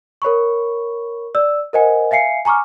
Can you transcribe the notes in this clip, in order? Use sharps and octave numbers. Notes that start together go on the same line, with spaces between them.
A#4 C#5 B5 C#6
D5 E6
A#4 C5 D#5 F#5 G#5
E5 F5 G#5 C7 C#7
G#5 A#5 C#6 D6 F6